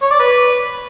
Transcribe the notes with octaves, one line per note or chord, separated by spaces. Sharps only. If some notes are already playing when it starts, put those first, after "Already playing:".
C#5
D5
B4